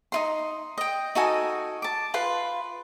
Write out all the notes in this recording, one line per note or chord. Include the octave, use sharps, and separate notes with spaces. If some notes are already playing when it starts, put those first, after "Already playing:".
D#4 F4 C6
D#5 G5
D#4 F#4 A4 G#5
A5 D6
F4 B4 C6